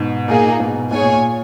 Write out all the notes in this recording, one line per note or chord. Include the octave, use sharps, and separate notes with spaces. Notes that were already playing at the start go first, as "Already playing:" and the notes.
Already playing: G#2 B2
A#2 A#3 D#4 G#4
A#2
G#2 B2
G#2 B2 G#4 C#5 G#5
A#2
A#2